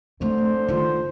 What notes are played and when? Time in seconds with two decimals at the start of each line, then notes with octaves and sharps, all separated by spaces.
0.21 D3 A3 C4 C5
0.69 D#3 F4